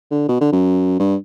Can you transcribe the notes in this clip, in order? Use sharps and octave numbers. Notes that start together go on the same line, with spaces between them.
D3
B2
D3
F#2
G2